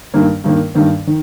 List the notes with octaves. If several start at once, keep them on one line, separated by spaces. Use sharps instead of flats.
G2 D#3 A#3
G2 D#3 A#3
G2 D#3 A#3
D#3